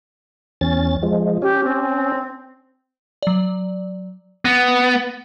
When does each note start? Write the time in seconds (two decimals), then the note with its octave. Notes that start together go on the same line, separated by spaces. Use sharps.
0.61 E2 C#4 A6
1.03 F3 G#3
1.42 C#4 G4
1.64 C4
3.23 F#3 D5
4.45 B3 A#6